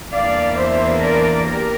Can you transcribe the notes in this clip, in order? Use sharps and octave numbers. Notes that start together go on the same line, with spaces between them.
E2 E3 A#3 D4 D5 F5
C5 E5
A#4 D5
G4 A#4